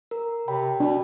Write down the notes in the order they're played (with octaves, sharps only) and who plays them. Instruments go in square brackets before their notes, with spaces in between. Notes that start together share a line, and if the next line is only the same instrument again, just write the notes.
[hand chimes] A#4
[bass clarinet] C3 [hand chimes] C#5 G5 B5
[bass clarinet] B2 [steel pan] D4